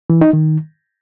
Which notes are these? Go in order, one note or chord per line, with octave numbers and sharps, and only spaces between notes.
E3
D#4
D#3